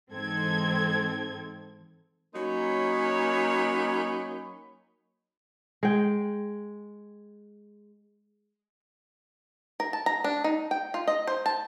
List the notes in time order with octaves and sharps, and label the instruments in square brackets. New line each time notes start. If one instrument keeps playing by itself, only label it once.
[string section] G#2 E3 C4 D#4 A4 G#6
[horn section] F#3 A#3 C#4 D#4 C#5 B5
[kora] G#3 G5
[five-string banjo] A#4
A5
A#5
D4
D#4
G5
F4
D#5
C5
A5